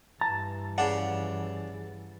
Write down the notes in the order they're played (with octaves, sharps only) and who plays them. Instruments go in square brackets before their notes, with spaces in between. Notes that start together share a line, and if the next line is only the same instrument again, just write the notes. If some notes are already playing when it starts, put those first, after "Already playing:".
[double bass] G2 E3 [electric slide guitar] A5 [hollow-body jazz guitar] A#5
[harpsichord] C#3 D4 [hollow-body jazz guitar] F#5